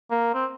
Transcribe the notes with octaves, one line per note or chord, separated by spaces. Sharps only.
A#3
C4